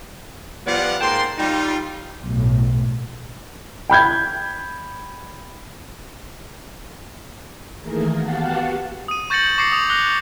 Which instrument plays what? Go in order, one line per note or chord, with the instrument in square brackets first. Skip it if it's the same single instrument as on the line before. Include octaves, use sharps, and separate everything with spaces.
[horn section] F3 G3 B3 D5 F5 F#5
G#2 A#3 G5 A5 C6
G3 D#4 F4
[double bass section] B1 A2
[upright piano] G5 B5 G6 G#6
[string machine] D#3 E3 A3 A#3 G#4 A#4
B3 F#4 G4 F5 F#5 A5
[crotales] D#6 D#7
C#6 G6 A6 A#6 C#7 F#7
C#6 D6 A#6 C7 C#7
D#6 F7
D6 F#6 A#6 F7 G7